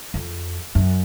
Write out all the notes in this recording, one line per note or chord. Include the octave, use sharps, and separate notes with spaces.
F2
F#2